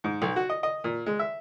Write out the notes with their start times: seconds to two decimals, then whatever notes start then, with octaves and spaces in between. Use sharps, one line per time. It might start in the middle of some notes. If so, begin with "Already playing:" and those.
0.04 G#2
0.22 B1
0.36 F#4
0.49 D#5
0.63 D#5
0.84 A#2
1.06 G#3
1.19 E5